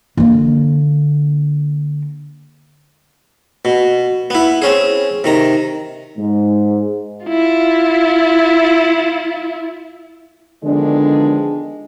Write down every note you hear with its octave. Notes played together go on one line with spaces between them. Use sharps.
D3 A#3
B2
B3 E4
C4 C#4 G#4
C3 D#3 A#5
G#2
E4 F4
D3 D#3 F3 G#3 B3 D4